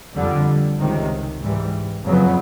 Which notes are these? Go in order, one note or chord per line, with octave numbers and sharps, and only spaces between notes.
F2 D3 G3
C#2 C3 D#3
G#2 E3 G3
F2 C#3 F#3 B3